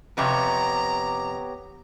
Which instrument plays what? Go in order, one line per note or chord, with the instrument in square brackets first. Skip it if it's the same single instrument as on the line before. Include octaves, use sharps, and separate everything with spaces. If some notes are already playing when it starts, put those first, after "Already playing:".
[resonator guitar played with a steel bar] F2 C3 [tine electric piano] B3 G4 C#5 [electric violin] A#5